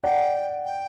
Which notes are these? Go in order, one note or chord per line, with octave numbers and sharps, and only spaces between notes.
D5 F#5 G5
G5